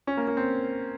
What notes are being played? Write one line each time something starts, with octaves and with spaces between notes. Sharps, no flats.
C#4
A#3
A#3
C4